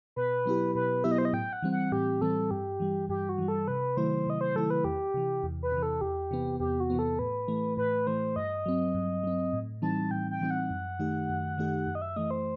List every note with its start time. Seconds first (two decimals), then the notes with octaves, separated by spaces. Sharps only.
0.16 B2 B4
0.46 F#3 B3 E4 G4
0.75 B2 B4
1.04 F#3 B3 E4 G4 E5
1.11 D#5
1.18 C5
1.25 D#5
1.33 A2 G5
1.53 F#5
1.62 E3 G3 C4
1.72 F#5
1.92 A2 G4
2.21 E3 G3 C4 A4
2.51 G2 G4
2.80 E3 G3
3.09 G2 G4
3.29 F#4
3.38 E3 G3
3.48 A4
3.68 C3 B4
3.97 D#3 F#3 A3 E4 C5
4.27 C3 D#5
4.41 C5
4.55 D#3 F#3 A3 E4 A4
4.70 B4
4.84 E2 G4
5.14 C3 E3
5.43 E2
5.63 B4
5.72 C3 E3
5.83 A4
6.01 E2 G4
6.31 C3 E3 B3
6.60 E2 G4
6.80 F#4
6.90 C3 E3 B3
6.99 A4
7.19 A2 B4
7.48 E3 A3
7.77 A2 B4
8.07 E3 A3 C5
8.36 G2 D#5
8.66 F#3 C4
8.94 G2
9.24 F#3 C4
9.53 A2
9.82 E3 G3 C4 D#4 A5
10.11 A2 G5
10.31 G5
10.40 E3 G3 C4 D#4
10.51 F#5
10.70 F#2
10.99 D#3 A3 D#4 G4
11.29 F#2
11.58 D#3 A3 D#4 G4
11.87 F#2
11.95 D#5
12.02 E5
12.16 E3 A3 D#5
12.31 C5